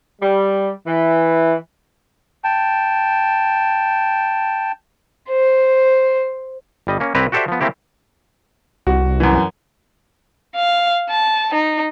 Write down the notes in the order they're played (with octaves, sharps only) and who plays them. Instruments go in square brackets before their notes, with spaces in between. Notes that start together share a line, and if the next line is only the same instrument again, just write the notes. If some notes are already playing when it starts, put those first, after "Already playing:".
[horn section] G3
E3
[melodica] G5 A5
[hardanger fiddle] C5
[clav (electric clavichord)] G1 G3 D#5
A#3 C#4
C2 C4 E4 G4 B4 A#5
F#4 G4 A4 C5 D5 E5
F3 B3
A3 A#3 C4 E4 G4
[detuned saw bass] C2 [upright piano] F#4
[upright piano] F#2 E3
[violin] F5
A5
D#4